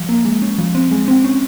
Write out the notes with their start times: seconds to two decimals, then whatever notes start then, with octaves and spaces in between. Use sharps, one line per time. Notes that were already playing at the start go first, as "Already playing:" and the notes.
Already playing: F3
0.09 A#3
0.25 G#3
0.42 C#4
0.58 F3
0.75 C4
0.91 G#3
1.08 C4
1.24 C#4